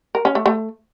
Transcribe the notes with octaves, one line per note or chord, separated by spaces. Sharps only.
A#4
C#4
A3
A3